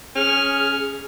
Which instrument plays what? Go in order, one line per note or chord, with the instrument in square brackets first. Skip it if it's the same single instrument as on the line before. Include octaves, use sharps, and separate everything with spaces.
[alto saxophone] C#4 [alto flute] G#4 [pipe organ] F6